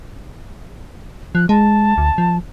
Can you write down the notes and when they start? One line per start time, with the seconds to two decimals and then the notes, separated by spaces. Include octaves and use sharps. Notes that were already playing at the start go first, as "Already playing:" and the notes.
1.35 F3 F#6
1.49 G#3 A5
1.98 D2
2.18 F3